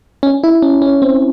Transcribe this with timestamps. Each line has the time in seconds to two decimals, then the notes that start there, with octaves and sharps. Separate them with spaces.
0.23 C#4
0.44 E4
0.62 C#4
0.82 C#4
1.02 C4